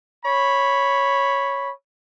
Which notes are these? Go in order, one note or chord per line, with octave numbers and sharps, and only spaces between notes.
C#5 B5